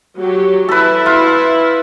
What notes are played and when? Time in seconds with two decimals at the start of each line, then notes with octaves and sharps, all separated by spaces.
0.17 F#3 G4
0.69 E4 A4 B4
1.06 F4